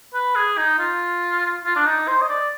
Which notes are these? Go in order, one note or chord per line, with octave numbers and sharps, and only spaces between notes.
B4
G#4
D#4
F4
F4
D4
D#4
C5
D#5
D5